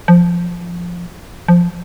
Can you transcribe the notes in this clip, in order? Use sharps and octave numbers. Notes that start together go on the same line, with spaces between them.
F3
F3